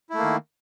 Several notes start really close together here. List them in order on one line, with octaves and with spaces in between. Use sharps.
E4 A3 A#3 D#3